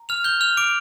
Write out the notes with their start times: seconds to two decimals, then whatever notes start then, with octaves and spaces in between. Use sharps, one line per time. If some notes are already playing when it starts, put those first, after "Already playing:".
Already playing: A#5
0.09 F6 F7
0.24 G6 G7
0.41 F6 F7
0.57 D6 D7